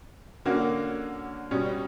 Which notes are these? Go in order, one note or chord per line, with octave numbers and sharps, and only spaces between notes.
D3 A#3 C#4 F#4
B2 G3 C#4